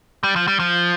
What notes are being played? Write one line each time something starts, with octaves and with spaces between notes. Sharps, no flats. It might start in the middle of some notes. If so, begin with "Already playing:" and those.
G3
F3
G3
F3